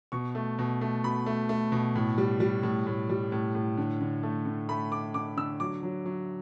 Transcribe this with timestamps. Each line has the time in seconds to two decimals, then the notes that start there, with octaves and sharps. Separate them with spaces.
0.12 B2 C#6
0.35 A3
0.59 B2
0.81 A3
1.04 B2 B5
1.26 A3
1.49 A3
1.72 B2
1.96 A2
2.18 G3
2.40 G3
2.63 A2
2.87 A2
3.09 G3
3.32 A2
3.55 A2
3.77 D3
4.01 D3
4.23 A3
4.45 D3
4.69 A3 B5
4.91 A3 D6
5.14 D3 D6
5.37 D3 E6
5.60 F#3 D6
5.83 F#3
6.06 F#3